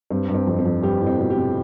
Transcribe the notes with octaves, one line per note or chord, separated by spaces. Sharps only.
G2 C4
G2
C4
F2
C4
F2
G2 G4
A2
C4
B2
G4
C3